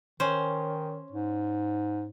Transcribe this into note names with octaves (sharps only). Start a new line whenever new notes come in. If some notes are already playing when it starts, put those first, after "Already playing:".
D#3 C#4 C5
G#2